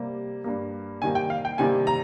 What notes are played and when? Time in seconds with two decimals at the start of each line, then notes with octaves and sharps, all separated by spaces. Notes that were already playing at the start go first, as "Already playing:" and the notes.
Already playing: C3 G3 A#3
0.44 G2 G3 A#3
1.02 C3 D#3 G3 A#3 G#5
1.15 G5
1.30 F5
1.45 G5
1.58 C3 D#3 G3 A#3 G#5
1.87 A#5